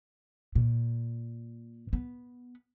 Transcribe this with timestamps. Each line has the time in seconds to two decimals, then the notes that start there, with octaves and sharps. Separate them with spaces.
0.55 A#2
1.93 B3